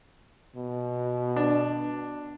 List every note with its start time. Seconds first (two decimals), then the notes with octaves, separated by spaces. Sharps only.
0.56 B2
1.36 D4